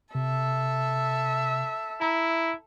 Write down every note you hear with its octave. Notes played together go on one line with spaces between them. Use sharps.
C3 A4 E5
E4 A#5